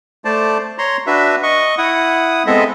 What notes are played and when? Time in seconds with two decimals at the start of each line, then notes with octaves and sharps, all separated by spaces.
0.25 A3 C5 D5 A5
0.78 C#5 A#5 C6
1.07 D4 F#4 B4 E5
1.43 D#5 C#6
1.78 E4 F#5 D#6
2.47 G#3 B3 C4 A4 D#5 E5